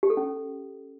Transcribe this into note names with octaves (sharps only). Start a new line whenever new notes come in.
G4
A4
C#4